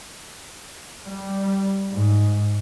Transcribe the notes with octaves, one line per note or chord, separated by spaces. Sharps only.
G3
G#2